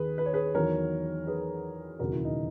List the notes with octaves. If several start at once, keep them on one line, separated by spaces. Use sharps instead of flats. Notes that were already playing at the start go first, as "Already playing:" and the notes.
Already playing: D#2 D#3 G#4 B4
B4
C#5
G#4 B4
E2 D#3 F#3 A#4 C#5
G#4 B4
E1 D#2 C#3 F#3 F#4 A#4
E4
D#4